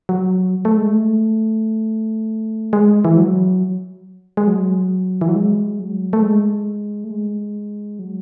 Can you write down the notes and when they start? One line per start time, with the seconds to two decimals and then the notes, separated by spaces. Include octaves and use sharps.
0.09 F#3
0.65 A3
0.77 G#3
0.88 A3
2.73 G#3
3.05 E3
3.17 F#3
4.37 G#3
4.48 F#3
5.21 E3
5.28 F#3
5.35 G#3
5.79 F#3
6.13 A3
6.23 G#3
7.04 A3
7.11 G#3
7.99 F#3